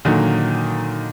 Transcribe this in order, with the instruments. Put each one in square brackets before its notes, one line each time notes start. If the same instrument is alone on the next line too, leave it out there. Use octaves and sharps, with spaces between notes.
[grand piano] A#2 D3 D#3 F#3